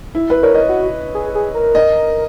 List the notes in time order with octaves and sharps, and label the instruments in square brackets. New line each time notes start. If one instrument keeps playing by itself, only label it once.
[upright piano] E4
B4
[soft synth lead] A#4 [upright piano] C#5
[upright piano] D#5
[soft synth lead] F#4
G#4
G#4
A#4
[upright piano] D#5